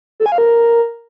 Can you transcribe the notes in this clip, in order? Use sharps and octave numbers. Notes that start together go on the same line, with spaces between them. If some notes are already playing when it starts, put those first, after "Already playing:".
A4
G#5
F5
A#4